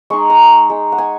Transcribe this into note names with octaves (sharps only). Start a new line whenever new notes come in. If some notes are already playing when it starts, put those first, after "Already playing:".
G#3 D#4 C#6
A#5
G#3 D#4
F#5
G#5